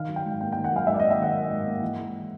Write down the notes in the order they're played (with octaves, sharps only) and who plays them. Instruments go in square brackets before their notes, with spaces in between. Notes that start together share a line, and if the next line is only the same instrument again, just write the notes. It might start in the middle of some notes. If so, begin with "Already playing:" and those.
Already playing: [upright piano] D#3 F5
F#3
G5
G#2
A#3 G5
G5
D#3
F#5
F#3 F5
G#2 E5
D5
D#5
A#3
E5
D#3 F#5
F#3
G#2
A#3
E3
G#3